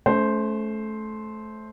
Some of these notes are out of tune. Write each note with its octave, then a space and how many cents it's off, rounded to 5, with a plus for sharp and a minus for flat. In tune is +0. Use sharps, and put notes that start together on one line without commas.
A3 -20 C#4 +25 C5 +0